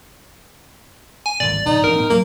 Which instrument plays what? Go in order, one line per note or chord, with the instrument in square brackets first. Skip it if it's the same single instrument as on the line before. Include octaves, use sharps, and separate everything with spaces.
[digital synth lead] G#5
[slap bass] G#1 D2 A#2 [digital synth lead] D5
[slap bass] A#1 G#2 C#3 [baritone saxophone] D#4
[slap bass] A1 D4 [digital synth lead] A#4
[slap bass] A2 B3 C4
[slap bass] D2 F#3 [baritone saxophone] A#3